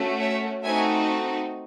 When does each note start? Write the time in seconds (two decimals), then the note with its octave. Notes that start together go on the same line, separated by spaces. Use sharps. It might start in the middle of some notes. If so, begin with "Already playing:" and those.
Already playing: A3 C#4 F#4
0.20 C#5 E5
0.64 A3 C4 D#4 F#4 E5 G#5